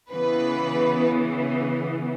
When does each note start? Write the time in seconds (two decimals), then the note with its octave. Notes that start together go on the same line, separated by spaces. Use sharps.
0.11 C#3 E3 B3 B4